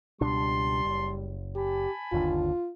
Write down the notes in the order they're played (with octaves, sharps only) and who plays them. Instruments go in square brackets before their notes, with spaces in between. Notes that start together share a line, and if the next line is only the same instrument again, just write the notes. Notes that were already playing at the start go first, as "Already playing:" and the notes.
[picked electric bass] C#2 B2 D4 [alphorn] G3 [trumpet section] A5 C6
[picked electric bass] F#1
[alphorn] G4 [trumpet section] G#5 A5 B5
[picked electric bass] G1 D#2 D3 [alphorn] F4